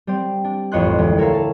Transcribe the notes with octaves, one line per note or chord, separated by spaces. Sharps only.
G3 C4
D4
A1 F2 C#5 D#5 C6 F#6
D2 E3 G#3
A4 A#4 C#5 E5 F5
A5